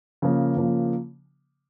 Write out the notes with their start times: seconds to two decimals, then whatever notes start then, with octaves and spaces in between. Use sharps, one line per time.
0.22 C#3 F3 A#3
0.57 C#3 F3 A#3